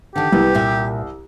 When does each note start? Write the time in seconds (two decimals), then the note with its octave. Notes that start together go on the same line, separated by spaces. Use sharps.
0.16 D3 D#3 G4
0.32 C2 B3
0.54 A#2 E5